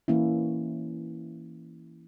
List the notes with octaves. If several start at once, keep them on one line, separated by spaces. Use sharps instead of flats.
E3 A#3 C#4 E4